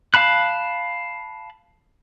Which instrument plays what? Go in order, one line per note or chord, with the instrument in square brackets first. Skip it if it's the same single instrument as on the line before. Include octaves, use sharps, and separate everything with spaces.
[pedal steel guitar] F5 A5 B5 F#6